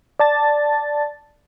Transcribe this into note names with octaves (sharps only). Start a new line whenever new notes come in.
D5 A5 A6